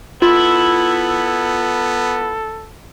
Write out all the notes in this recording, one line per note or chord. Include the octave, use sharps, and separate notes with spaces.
B3 E4 F4 A4